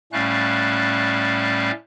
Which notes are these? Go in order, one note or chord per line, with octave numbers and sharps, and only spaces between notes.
A2 G3 A3 C#4 F5 F#6